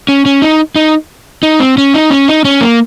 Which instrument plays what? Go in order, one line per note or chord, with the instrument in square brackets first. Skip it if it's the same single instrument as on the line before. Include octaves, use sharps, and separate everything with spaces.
[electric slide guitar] C#4
C#4
D#4
D#4
D#4
C4
C#4
D#4
C#4
D#4
C#4
A#3